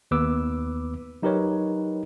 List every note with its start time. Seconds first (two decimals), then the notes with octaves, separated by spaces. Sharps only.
0.11 D#2 B3 B4 D6 E6
1.22 F#3 D#4 G4 A#4 B4 C#5